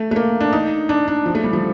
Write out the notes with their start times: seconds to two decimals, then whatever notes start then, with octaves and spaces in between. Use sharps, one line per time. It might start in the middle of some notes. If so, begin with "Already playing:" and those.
Already playing: A3
0.11 A3
0.16 A#3
0.40 D4
0.53 D#4
0.89 D4
1.08 D4
1.26 F3
1.35 A3
1.44 G3
1.53 F3